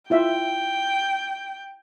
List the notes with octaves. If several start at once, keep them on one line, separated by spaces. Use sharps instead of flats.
E4 F4 E5 G5